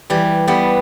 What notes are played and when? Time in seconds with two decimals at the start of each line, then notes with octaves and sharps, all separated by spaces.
0.10 E3 G3
0.47 G3 B3